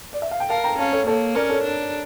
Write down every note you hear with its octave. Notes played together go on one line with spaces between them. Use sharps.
D5
E5
F5
G5
A#4 F5 A5
G5 A#5
C#4 F5 A5
A4 C#5
A#3 A4 C#5
C#4 A#4 D5
A4 C#5
D4